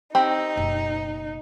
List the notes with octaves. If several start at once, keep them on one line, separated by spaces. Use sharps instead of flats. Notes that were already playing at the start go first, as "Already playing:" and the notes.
C4 D#4 G4
F#1 B2